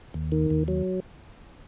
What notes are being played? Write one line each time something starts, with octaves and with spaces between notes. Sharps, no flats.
D#2
D#3
D#2
F#3